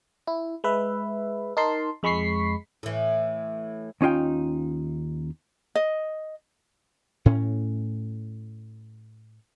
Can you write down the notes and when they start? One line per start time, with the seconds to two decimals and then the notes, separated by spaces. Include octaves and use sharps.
0.27 E4
0.64 G#3 B4 E5
1.57 D#4 A#4 A5 C6
2.03 F2 G#3 B5 C#6 B6 C7
2.83 A2 E3
4.01 D#2 C#4 D#4 F4 G5
5.75 D#5
7.26 A2 C#4